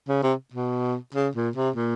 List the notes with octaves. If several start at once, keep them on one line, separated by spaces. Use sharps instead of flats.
C#3
C3
B2
C#3
A#2
C3
A#2